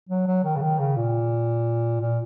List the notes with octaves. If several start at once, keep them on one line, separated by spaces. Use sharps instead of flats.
F#3
F#3
D#3
C#3
D#3
C#3
A#2
A#2